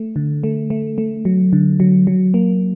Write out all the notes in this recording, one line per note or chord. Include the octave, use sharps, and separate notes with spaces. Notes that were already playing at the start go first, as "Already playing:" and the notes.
Already playing: A3
D3
A3
A3
A3
F#3
D3
F#3
F#3
A#3